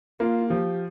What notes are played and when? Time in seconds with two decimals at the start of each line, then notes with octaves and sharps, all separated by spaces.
0.20 A#3 F4
0.50 F3 G4